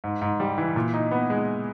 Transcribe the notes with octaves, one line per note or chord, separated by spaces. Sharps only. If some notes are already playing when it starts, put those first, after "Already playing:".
G#2
G#2
G3
E3
A#2
D#4
B3
G#3